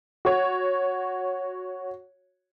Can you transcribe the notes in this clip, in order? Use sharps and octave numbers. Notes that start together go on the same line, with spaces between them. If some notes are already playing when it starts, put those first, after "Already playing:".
F#4 C#5